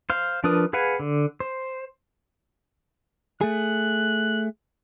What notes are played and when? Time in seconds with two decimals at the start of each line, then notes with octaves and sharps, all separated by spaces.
0.10 C5 F5
0.44 F3 D4 A#4 B4 D#6
0.73 G#4 B4 F5 F#5 G#5
0.99 D3
1.40 C5
3.41 A3 G#4 F#6